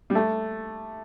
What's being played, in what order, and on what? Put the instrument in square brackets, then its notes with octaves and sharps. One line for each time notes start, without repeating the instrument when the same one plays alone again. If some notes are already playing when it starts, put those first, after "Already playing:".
[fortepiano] G3
A3